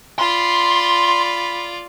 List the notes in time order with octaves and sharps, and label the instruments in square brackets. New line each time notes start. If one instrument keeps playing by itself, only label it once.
[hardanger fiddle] F4 D5 [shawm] B5 [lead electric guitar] C6